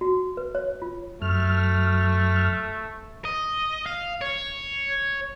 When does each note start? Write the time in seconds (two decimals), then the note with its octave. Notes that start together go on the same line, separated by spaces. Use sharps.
0.01 F#4
0.37 B4
0.55 C#5
0.82 F4
1.22 F#2 A3 F6
3.25 D#5
3.86 F5
4.21 C#5